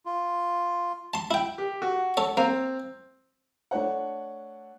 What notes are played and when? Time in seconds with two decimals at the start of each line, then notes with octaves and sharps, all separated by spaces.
0.05 F4
1.14 A5 C6
1.31 E4 G5
1.58 G4
1.82 F#4
2.17 A4 C#5
2.37 A#3 C4
3.71 A3 D4 C#5 F#5